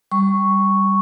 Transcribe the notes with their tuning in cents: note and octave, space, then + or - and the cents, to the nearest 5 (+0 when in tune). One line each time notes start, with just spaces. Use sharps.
G3 +0 C#6 +0